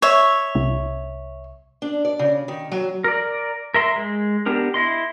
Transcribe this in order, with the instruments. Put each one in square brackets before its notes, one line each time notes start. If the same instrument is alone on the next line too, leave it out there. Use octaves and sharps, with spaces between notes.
[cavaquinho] C#5 E5
[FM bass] C2
[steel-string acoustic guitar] D4
D5
C#3
D#3
F#3
[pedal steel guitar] A#4 D5
A#4 E5 C6
G#3
B3 D4 G4 A#4
E4 D#5 C6